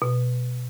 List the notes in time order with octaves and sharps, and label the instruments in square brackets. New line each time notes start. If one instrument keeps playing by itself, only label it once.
[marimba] B2